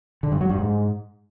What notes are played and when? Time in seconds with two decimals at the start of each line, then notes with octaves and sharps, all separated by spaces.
0.23 D3
0.32 G2
0.41 F#3
0.50 G2
0.58 G#2